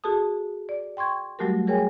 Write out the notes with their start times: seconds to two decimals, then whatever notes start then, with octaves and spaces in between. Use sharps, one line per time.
0.04 F#4 G#4 A4 A5 D#6
0.69 D5
0.97 G5 C6 C#6 G#6
1.39 F#3 G3 A3 F#4 G4 A#4
1.67 G#4 A#4 C#5 G5 G#5